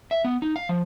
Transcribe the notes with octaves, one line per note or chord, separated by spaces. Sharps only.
E5
B3
D#4
F5
F3